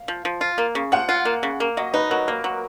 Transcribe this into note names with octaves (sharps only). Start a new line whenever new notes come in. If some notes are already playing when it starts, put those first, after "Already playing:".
Already playing: F5
F3
F3
F4
A#3
C#3
F3 F#5
F4
A#3
C#3
A#3
F#3 D#5
D#4 B4
F#3 A#4
A#3 A#4
F#3